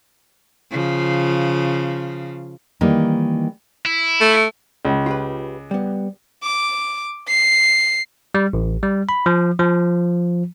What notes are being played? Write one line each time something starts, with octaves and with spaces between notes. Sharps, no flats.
C#3 F3
D#3 E3 G3 A#3 D#4
E4
A3
C#2
F4 G4 B4
G3 B3
D6
C7
G3
A1
G3
B5
F3
F3